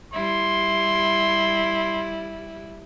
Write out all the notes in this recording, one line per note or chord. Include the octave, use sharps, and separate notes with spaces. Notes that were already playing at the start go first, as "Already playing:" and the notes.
G3 E4 C6